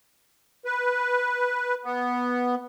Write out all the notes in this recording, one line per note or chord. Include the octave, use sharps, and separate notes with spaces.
B4
B3